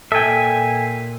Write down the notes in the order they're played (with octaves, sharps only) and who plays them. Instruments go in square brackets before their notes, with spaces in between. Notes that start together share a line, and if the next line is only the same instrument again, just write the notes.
[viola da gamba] A#2 [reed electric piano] A4 G5 [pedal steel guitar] E5 G#5